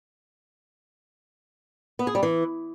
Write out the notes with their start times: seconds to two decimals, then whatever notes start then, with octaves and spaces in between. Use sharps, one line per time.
1.99 B3
2.07 G#4
2.15 G3
2.23 E3